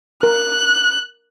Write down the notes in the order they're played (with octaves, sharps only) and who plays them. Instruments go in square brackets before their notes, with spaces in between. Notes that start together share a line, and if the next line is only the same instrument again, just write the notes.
[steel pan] A#4 [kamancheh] F#6